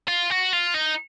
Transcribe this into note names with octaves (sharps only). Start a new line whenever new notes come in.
F4
F#4
F4
D#4